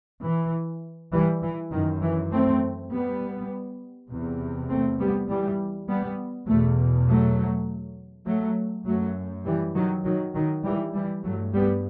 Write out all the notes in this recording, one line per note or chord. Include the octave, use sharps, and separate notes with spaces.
E3
E3 G3
E3
F#2 D#3
E3
A3 C4
G3 B3
E2 C3
A3 C4
G3 B3
E3 G3
G3 B3
E2 B2 F#3 A3
F#3 A3
F#3 A3
F#2 F#3 A3
E3 G3
D#3 F#3
D#3 F#3
D#3 F#3
E3 G3
E3 G3
G2 F#3 A3
G3 B3